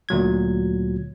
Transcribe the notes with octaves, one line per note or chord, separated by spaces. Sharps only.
D2 A#2 F#3 G#6